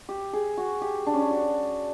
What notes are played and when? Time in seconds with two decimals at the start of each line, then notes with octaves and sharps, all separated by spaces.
0.09 G4
0.33 G#4
0.58 F#4
0.82 G4
1.07 D4
1.14 C#4
1.22 D4
1.31 F#4